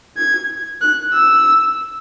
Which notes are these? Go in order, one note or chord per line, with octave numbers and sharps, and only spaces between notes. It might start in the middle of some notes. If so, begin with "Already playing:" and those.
G#6
F#6
E6